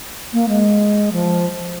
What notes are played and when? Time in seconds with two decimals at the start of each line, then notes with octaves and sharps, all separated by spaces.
0.33 A#3
0.49 G#3
1.12 F3